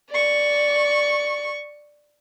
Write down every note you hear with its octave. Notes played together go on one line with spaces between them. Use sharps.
D5 C#6